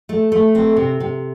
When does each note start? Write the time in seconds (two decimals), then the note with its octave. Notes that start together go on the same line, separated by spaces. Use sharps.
0.09 A3
0.32 A3
0.55 C4
0.77 C3
1.00 C3